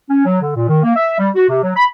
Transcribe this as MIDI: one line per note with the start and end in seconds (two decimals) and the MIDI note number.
0.10 0.25 61
0.26 0.40 54
0.41 0.53 50
0.56 0.68 46
0.68 0.79 51
0.83 0.94 58
0.96 1.17 76
1.19 1.29 55
1.36 1.44 66
1.49 1.61 48
1.63 1.74 54
1.75 1.85 83